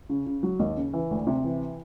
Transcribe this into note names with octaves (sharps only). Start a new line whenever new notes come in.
C#3
C#3
F#3
D#2
C#3
E3
D2
C3
E3